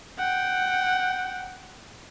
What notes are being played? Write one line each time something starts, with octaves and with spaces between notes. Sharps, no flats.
F#5 G5